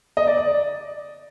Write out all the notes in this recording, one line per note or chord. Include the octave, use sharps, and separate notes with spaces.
D#5
D5
D5